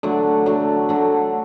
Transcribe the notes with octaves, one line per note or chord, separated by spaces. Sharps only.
D3 F#3 A3
D3 F#3 A3
D3 F#3 A3